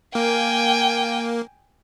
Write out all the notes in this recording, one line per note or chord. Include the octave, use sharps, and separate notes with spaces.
A#3 G5 G#5